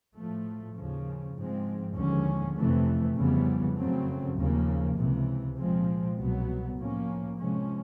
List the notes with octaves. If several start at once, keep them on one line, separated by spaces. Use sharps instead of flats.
A2 F3 A3
D#2 C#3 F3
G#2 F3 G#3 C4
D#2 D3 F3 G#3 C#4
F2 C3 E3 A3
F2 C#3 E3 G3 B3
F#2 C#3 F#3 A3 C4
D#2 C#3 F3 A#3
C#2 C3 E3
A#2 F3 G#3 C4
C2 B2 F#3 B3
A2 F3 A#3 C#4
C3 F3 G#3 C#4